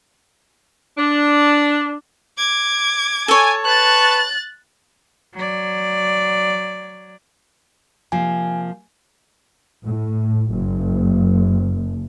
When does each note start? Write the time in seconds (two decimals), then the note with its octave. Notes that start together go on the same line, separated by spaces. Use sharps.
0.98 D4
2.37 D6 G#6
3.28 A4 C#5 G#5
3.64 B4 A5 C#6 F#6 A6
5.34 F#3 D5
8.12 C3 F3 A#3 G#5
9.85 A2
10.53 F#1